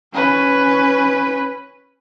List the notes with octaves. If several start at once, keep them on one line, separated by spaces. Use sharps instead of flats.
C#4 B4